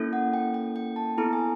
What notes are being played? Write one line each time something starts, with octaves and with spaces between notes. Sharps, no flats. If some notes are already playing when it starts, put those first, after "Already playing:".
Already playing: A#3 C#4 E4 A4
F#5
G5
G5
G5
A5
B3 E4 A4 A#5
G#5